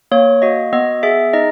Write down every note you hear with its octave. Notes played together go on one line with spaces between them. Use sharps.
A#3 C#5
F#4 D#5
B3 D#5
G#4 E5
D#4 D#5